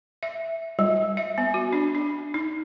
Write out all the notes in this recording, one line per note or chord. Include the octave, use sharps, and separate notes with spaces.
E5
G3
E5
B3
F#4
D4
D4
D#4